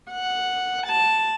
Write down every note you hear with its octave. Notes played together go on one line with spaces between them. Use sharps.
F#5
A5